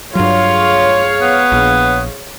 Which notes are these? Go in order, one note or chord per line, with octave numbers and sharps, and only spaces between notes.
G2 F#3 F4 G#4 C#5 F5
B3
A#1